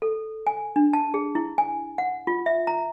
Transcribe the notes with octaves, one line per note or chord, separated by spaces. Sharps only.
A4
G#5
D4
A5
G#4
E4
G#5
F#5
F4
E5
A#5